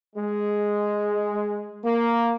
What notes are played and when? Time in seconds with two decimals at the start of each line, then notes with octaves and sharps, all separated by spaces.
0.16 G#3
1.85 A#3